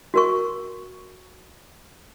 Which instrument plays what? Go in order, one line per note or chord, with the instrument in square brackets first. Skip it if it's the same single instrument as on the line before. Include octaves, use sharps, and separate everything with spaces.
[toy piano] F#4 A#4 C#6